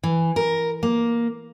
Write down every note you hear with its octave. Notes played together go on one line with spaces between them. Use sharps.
E3
A#4
A#3